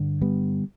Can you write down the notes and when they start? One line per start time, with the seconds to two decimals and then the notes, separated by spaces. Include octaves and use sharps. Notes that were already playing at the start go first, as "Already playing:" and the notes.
Already playing: G2 D3
0.21 G3 B3